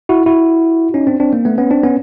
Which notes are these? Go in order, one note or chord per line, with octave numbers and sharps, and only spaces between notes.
E4 F#4
E4 F#4
C#4 D#4
C4 D4
C4 D4
A#3
A3 B3
B3 C#4
C4 D4
B3 C#4